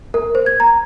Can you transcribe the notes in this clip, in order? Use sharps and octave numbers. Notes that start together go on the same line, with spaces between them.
A#4
C5
G#6
A#5